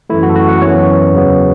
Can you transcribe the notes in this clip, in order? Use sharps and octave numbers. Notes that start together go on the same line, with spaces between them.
F#2 E3 A3 E4
F#4
A4
F#4
F#5
F#2 E3 B3 C#5
E2 C#3 F#3 B3